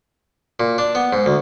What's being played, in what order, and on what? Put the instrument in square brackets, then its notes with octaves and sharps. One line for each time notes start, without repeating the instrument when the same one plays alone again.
[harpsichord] A#2
D4
B3
G#2
D2